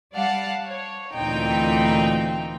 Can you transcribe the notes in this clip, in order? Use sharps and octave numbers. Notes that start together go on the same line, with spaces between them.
G3 D5 F5 F#5 A5
C#5
D2 A#2 E3 C4 D#4 G5